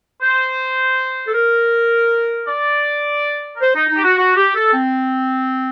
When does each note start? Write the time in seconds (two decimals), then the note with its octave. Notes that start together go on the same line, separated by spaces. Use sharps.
0.21 C5
1.27 A4
1.34 A#4
2.47 D5
3.56 A#4
3.61 C5
3.75 D#4
3.89 D#4
3.96 G4
4.03 F#4
4.17 F#4
4.36 G4
4.55 A4
4.73 C4